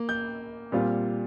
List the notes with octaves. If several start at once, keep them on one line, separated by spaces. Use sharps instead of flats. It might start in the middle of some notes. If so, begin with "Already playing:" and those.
Already playing: A#3
G6
A#2 G3 C4 F4